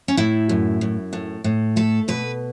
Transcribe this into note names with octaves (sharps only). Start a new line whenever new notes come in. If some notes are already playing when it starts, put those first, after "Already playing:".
C#4
A2 E4
F#2
F#2
A2
A2
A3 A4
B2 B4